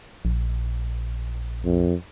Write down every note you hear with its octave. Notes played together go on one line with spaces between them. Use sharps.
A#1
F2